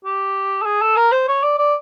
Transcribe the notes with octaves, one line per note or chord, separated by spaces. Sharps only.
G4
A4
G#4
A4
A#4
C5
C#5
D5
D5